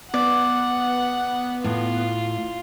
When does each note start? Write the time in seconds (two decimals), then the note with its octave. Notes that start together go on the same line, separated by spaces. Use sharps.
0.14 B3 D5 F#5
1.64 A2 F4